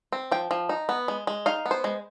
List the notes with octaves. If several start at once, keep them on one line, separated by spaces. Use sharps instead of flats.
C4
F3 G5
F3
D#4
B3
G#3
G#3
D#4 F5
B3
C5
G#3